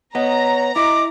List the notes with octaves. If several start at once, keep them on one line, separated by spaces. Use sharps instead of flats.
B3 C#5 D#5 A#5
E4 D#5 D6